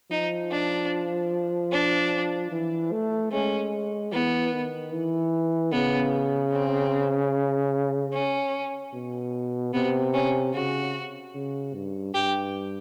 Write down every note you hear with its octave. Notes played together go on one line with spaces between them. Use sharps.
F3 D#4
D4
D4
E3
A3
G#3 C#4
E3 B3
D#3
E3
C#3 B3
C4
C#4
B2
C3 B3
C#4
C#3 F#4
C#3
G2
G2 G4